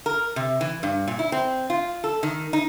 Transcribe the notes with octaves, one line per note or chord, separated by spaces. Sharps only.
A#4
C3
E3
G2
A#2
E4
C4
F4
A4
D#3
D#4